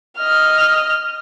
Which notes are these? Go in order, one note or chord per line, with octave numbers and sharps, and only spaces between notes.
D#5 F6